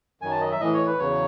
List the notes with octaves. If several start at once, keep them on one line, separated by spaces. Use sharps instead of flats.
F#2 D#3 F#3 G#5
A5
D#5
E5
A2 E3 D#5
C#5
B4
E2 C#3 F#3 C#5